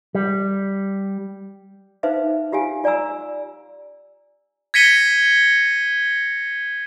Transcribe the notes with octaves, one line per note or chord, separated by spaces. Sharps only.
G3
D#4 B4 C5 E5 F5
F4 G4 F5 G#5
F4 D5 G#5 A#5 E6
G#6 A#6 B6 C#7 D#7 G7